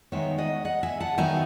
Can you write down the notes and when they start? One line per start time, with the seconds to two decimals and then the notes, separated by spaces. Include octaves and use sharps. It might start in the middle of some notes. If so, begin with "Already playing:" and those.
0.12 D#3 G#3 B3 D#4 C#5 E5
0.38 D#5 F#5
0.65 D#5 F#5
0.83 E5 G#5
1.00 F#5 A5
1.18 D#3 F#3 B3 D#4 E5 G#5